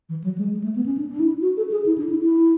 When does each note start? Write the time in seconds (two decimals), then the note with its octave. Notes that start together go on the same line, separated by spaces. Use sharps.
0.09 E3
0.24 F#3
0.38 G#3
0.53 G#3
0.64 A3
0.76 B3
0.86 C#4
0.97 D4
1.09 D4
1.20 E4
1.42 F#4
1.57 A4
1.71 G#4
1.86 E4
1.98 D4
2.09 E4
2.20 E4